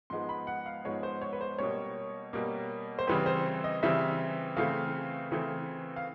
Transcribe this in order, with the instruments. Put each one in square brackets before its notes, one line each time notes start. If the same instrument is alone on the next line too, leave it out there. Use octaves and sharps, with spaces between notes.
[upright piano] G#2 F3 G#3 B3 C6
B5
F#5
F5
G#2 F3 G#3 B3 C#5
C5
C#5
B4
C5
B2 G3 A#3 C#5
B2 G3 A#3
C5
C#3 E3 G3 C4 B4
C5
D#5
C#3 E3 G3 C4 E5
C#3 E3 A3 C4 F5
C#3 E3 A3 C4
F5